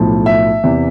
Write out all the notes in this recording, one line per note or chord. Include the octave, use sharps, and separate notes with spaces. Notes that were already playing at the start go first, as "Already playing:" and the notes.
Already playing: B1 A2 F3
E5
E2 C3 E3